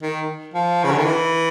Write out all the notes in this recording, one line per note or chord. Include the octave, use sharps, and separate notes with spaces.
D#3
F3
C#3
D3
D#3
E3